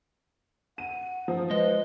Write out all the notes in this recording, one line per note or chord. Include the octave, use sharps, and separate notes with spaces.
F#5 D#7
F3
G#3 B4 D#5